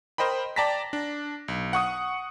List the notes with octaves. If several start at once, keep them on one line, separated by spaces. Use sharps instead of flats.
A#4 C5 D#5 G5 B5
D5 G5 A5 A#5 A#6 B6
D4
B1
F#5 C#6 D#6